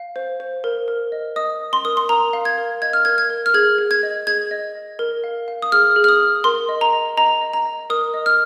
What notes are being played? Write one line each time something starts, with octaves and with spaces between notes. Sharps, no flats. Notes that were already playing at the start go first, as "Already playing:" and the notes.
Already playing: F5
C5
C5
A#4
A#4
D#5
D#5 D#6
D#5
C6
A#4 D#6
C6
A#4 A#5
F5
G#6
A#4
D#5 G#6
F6
A#4 G#6
G#6
A#4
F6
G#4 G#6
G#4
G#6
D#5
G#4 G#6
D#5
D#5
A#4
F5
F5
D#6
G#4 F6
G#4
F6
D#6
G#4
A#4 C6
D#5
A#5
D#5
D#5 A#5
D#5
A#5
D#5
A#4 D#6
D#5
F6